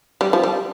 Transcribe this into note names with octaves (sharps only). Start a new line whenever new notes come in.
G3
F3
G3